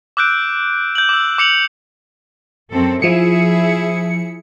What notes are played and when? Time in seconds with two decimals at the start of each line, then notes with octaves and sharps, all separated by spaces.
0.17 D6 E6 F#6 G6 D7
0.95 G6 F#7
1.09 D6 E6
1.38 D6 C#7 F7 F#7
2.72 F#2 C4 A4
3.02 F3 E4 G#4 E5 C#7